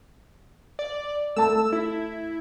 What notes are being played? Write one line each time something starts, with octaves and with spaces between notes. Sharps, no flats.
D5
A3 A5 E6
E4